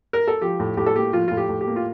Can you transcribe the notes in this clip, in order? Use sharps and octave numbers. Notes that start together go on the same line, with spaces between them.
A#4
A4
F3 G4
A2
A2 G4
A4
A#3 G4
F3 F4
A2 F4
G4
A2
G4
A#3
F4